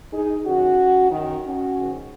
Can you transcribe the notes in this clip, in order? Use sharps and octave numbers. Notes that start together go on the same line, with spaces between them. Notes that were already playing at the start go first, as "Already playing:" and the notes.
D#4 G#4
F#2 D#3 C#4 F#4
F#2 D#3
C#4 F#4
G#2 D#3